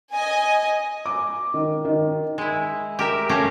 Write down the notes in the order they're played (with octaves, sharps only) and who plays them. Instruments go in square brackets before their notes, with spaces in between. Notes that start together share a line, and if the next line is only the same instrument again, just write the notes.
[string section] D#5 G#5
[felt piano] D6
D#3
D#3
[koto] G#3 E4
G4 A#4 E5
A3 C#4 G4 F5 A#5